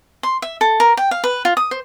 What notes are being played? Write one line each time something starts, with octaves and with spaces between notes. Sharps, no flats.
C6
E5
A4
A#4
G5
F5
B4
F4
D#6
C5